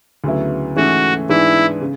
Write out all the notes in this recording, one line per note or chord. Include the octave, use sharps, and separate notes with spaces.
D2 C#3 F#3 B3 E4
G#2 E3 A3 C#4 F#4
G#2 E3 B3 D4 E4
C#3